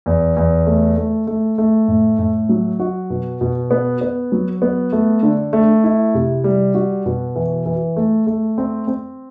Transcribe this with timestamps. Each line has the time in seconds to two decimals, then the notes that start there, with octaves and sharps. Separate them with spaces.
0.06 E2
0.37 E2
0.66 A3
0.97 A3
1.27 A3
1.58 A3
1.88 A2
2.19 A2
2.49 F#3
2.80 F#4
3.10 B2
3.41 B2
3.71 B3
4.01 B3
4.32 F#3
4.62 B3
4.92 A3
5.23 D3
5.53 A3
5.84 E4
6.15 C3
6.44 G3
6.75 F#4
7.06 B2
7.36 E3
7.66 E3
7.96 A3
8.27 A3
8.58 C4
8.87 C4